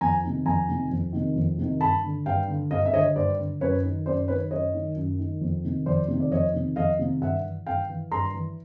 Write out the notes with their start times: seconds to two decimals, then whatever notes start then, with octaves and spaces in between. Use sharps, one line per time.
0.01 F2 G#5 A#5
0.24 C3 D#3
0.45 F2 G#5 A#5
0.69 C3 D#3
0.91 F2
1.13 C3 D#3
1.36 F2
1.58 C3 D#3
1.81 G2 A5 B5
2.04 D3
2.26 G2 F5 G5
2.48 D3
2.71 G2 D#5 F5
2.85 E5
2.93 D3 C#5 D#5
3.16 G2 C5 D5
3.39 D3
3.61 F#2 B4 C#5
3.84 D#3
4.06 F#2 C5 D5
4.28 D#3 B4 C#5
4.51 F#2 C#5 D#5
4.74 D#3
4.96 F#2
5.19 D#3
5.41 F2
5.64 C3 D#3
5.86 F2 C5 D5
6.08 C3 D#3
6.20 D5
6.31 F2 C#5 D#5
6.54 C3 D#3
6.76 F2 D#5 F5
6.99 C3 D#3
7.21 G2 E5 F#5
7.44 E3
7.66 G2 F5 G5
7.89 E3
8.11 G2 A#5 C6
8.34 E3